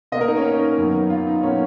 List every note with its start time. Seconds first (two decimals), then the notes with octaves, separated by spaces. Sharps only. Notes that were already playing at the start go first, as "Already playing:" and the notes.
0.12 B2 A#3 D#5
0.21 A#4
0.28 D#4
0.37 C#4
0.45 D#4
0.78 F#2 D#3 F#3 B3
1.10 F4
1.27 D#4
1.43 B2 F#3 A#3 C#4